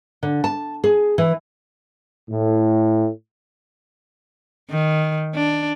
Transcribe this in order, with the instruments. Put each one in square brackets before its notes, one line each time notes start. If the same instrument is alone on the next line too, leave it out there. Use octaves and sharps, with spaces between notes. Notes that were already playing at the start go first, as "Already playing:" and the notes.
[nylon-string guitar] D3
A5
G#4
E3
[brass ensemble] A2
[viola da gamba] D#3
D4